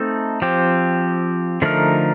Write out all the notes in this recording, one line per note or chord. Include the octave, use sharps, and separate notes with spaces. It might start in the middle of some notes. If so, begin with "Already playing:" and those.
Already playing: A3 C4 D#4 A4
F3 C4 G4
D3 F3 A3 D#4 A#4